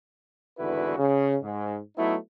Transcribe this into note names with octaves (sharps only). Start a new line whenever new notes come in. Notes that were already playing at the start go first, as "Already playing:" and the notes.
G#1 E2 D3 E4 F#4 B4
C#3
G#2
F#3 A3 B3 D#4 E4